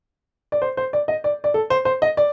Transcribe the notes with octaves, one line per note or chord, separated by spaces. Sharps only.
D5
C5
C5
D5
D#5
D5
D5
A4
C5
C5
D#5
D5